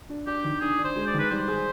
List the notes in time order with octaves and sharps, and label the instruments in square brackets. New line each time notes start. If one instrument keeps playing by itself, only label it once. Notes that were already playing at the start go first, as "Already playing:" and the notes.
[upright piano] D4
[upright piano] D4 [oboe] G4
[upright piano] D#3
[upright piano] D4 [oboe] G#4
[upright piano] D4
[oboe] C5
[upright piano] G#3
[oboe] D5
[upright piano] D#3
[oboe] B4
[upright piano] G3 [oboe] C5
[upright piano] G#4